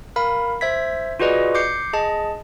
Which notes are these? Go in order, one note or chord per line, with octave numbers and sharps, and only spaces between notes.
A#4 F5 B5
C5 E5 G#6 B6
F4 F#4 G#4 B4 D5 D#5
D6 G6 C7 C#7
G#4 D#5 A5